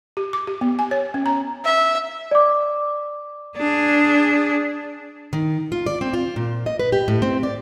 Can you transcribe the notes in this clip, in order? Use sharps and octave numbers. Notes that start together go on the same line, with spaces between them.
G4
D6
G4
B3
G#5
C#5
C#4
A#5
E5
D5 D6
D4 G#4
D#3
F4
D5
C4
F4
A#2
D#5
B4
G4
A2
C4
D5